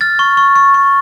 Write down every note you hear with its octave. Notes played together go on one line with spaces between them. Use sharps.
F6 A6
C#6
C#6
C#6
C#6